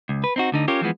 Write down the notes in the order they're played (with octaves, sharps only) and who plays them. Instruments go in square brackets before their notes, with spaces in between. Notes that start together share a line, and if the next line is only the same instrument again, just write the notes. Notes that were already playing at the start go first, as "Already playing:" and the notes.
[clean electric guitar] C#2
B4
C4 D#4 F#4
D2 D3 D#4
C#4 F4 G4 A#4 C#5
E3 F3 G#3 B3